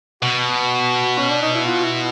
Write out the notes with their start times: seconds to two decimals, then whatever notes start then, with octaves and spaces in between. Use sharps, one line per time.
0.22 B2 F#4
1.18 C#4
1.30 D4
1.42 D#4
1.55 E4
1.66 F4
1.84 E4